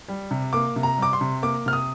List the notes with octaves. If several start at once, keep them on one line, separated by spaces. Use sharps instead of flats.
G3
C3
A#3 D6
C3
A#5
G3 D6
C6
C3
A#3 D6
C3 F6
D#6